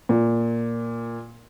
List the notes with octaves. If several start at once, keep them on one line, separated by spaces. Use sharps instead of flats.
A#2